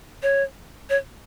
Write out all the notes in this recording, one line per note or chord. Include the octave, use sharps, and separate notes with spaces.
C#5
C#5